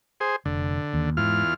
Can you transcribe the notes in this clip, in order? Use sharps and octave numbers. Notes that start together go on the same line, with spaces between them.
G#4 C5
F1 D3
D#2
E2 G#2 F4 F6